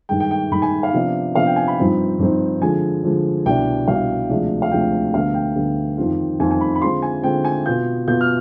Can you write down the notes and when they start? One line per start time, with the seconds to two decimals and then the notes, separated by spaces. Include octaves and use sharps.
0.09 G2 D#3 G#3 G5
0.20 G5
0.31 G5
0.51 G2 D#3 G#3 B5
0.62 G#5
0.83 F5
0.93 C3 F3 B3 D4
1.35 C3 F3 B3 D4 F5
1.47 G5
1.56 G#5
1.68 B5
1.78 G2 F3 C4 D#4
2.19 G2 F3 C4 D#4
2.61 D3 F3 G#3 G#5
3.03 D3 F3 G#3
3.46 C2 B2 G3 D4 G5
3.88 C2 B2 G3 D4 F5
4.29 D2 C3 F3 G#3 D4
4.62 F5
4.72 D2 C3 F3 G#3 D4 G5
5.13 D2 D3 G3 B3 F5
5.34 G5
5.55 D2 D3 G3 B3
5.98 F2 D#3 G3 C4 F4
6.39 F2 D#3 G3 C4 F4 G#5
6.51 G#5
6.61 B5
6.75 B5
6.81 D3 G#3 C4 F4 C6
7.02 G#5
7.23 D3 G#3 C4 F4 G5
7.45 G#5
7.66 B2 B3 F4 G6
8.07 B2 B3 F4 G6
8.21 F6